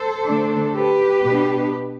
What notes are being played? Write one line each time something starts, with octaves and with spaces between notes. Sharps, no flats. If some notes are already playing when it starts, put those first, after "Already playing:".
Already playing: A4 C5
D3 A3 D4
G4 B4
B2 B3 D4